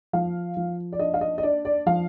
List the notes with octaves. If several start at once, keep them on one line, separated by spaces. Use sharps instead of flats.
F3 F5
F3
D5
D4 D#5
F5
D#5
D#5
D4 D5
D5
F3 F5